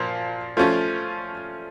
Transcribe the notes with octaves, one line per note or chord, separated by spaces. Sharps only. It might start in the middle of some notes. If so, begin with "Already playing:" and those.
Already playing: A#2 F3 A#3
F3 A3 C#4 F4